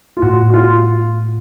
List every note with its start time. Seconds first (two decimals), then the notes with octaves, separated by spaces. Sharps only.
0.17 F4
0.22 A2 F#4
0.50 F#4
0.54 F4